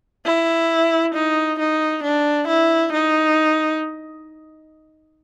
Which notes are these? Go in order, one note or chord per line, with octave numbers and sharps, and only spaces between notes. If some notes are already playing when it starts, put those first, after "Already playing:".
E4
D#4
D#4
D4
E4
D#4